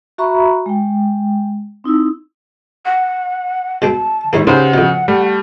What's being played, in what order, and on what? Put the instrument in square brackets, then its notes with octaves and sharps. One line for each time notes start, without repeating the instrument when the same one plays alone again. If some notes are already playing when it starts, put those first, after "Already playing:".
[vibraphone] F#4 E5 A#5 B5 C#6
G#3 G5
C4 D#4 E4 E6
[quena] F#5
[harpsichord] B2 G#3 G5 [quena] A5
[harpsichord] D#3 G#3 A#3 [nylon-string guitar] E3 G3 [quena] C#5
[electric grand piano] C#3 [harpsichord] D#4 [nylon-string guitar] G4 B4 C5 [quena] F#5
[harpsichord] F2 B2
[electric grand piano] G3 [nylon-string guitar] A3